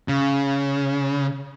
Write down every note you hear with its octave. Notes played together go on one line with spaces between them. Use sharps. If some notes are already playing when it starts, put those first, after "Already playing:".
C#3